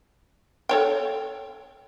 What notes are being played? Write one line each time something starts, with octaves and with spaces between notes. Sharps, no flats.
A4 C#5 G5